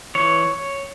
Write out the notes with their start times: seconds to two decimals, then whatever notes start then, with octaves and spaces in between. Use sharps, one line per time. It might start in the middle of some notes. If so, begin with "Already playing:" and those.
0.15 E3 C#5